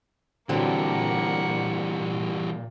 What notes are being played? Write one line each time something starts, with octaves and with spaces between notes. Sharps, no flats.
A#2 D3 E3 F#3 G3 A#3 C4 F#5